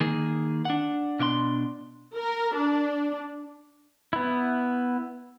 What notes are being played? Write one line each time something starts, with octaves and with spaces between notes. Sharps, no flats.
D#3 A#3 G#4
D4 F#5
B2 D4 E5 C6
A#4
D4
B3 E4